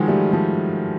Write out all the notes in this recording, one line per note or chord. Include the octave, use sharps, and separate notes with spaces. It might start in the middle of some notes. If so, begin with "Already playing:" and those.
Already playing: D#3 F3 F#3 G#3
G3 A3
F3 G3